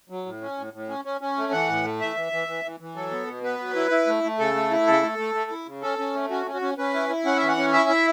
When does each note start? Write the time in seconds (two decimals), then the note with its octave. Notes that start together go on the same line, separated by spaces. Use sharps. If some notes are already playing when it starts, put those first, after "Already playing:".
0.09 F#3
0.26 A2
0.41 C#4
0.57 A2
0.73 A2
0.88 C#4
1.05 C#4
1.21 C#4
1.37 A3
1.53 E3 F#5
1.69 A2
1.84 A3
2.00 E3 E5
2.16 E3
2.32 E3
2.48 E3
2.64 E3
2.80 E3
2.95 F#3 A4
3.11 B3
3.27 B2
3.44 B3 B4
3.59 F#3
3.76 E4
3.91 E4
4.07 A3
4.24 A3
4.39 C#3 A4
4.55 A3
4.71 E4
4.87 C#3 A4
5.03 A3
5.18 A3
5.34 A3
5.51 E4
5.66 C#3
5.82 C#4 A4
5.99 C#4
6.14 A3
6.30 C#4 F#4
6.46 C#4
6.54 F#4
6.62 C#4
6.78 C#4 B4
6.94 E4
7.09 E4
7.25 C#4 F#5
7.37 E3 E5
7.48 F#5
7.57 C#4
7.73 E4 E5
7.89 E4